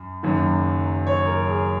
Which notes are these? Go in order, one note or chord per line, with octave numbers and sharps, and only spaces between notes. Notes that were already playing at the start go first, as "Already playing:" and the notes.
Already playing: F#2
F#1 F#2 D#3 F#3
C#5
A#4
G#4